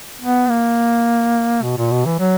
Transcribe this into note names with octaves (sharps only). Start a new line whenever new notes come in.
B3
A#3
B2
A#2
B2
E3
F#3